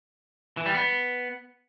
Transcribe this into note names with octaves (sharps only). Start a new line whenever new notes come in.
E3
G3
B3